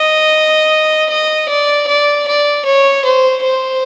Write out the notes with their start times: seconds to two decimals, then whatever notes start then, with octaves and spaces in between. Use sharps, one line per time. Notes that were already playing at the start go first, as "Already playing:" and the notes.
Already playing: D#5
1.10 D#5
1.49 D5
1.87 D5
2.27 D5
2.65 C#5
3.05 C5
3.43 C5